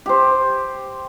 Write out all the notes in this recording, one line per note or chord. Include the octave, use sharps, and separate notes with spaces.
G4 C5